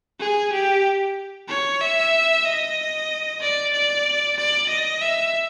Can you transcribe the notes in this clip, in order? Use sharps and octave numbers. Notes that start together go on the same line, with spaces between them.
G#4
G4
C#5
E5
D#5
D5
D5
D5
D#5
E5